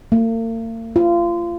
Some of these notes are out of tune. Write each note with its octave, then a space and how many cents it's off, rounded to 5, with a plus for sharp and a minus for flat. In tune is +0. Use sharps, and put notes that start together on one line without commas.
A#3 -45
F4 -25